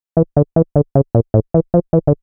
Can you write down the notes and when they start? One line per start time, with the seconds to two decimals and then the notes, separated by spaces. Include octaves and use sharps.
0.17 E3
0.37 D3
0.56 E3
0.76 D3
0.95 C#3
1.15 A#2
1.34 A2
1.54 E3
1.74 F3
1.93 E3
2.07 D3